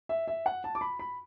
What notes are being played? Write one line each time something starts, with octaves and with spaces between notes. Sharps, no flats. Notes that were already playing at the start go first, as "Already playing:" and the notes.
E5
E5
F#5
A5
D6
B5
B5